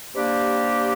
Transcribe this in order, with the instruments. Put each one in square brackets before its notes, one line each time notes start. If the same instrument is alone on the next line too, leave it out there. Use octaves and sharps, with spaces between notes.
[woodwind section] C3 G3 A#3 D4 G4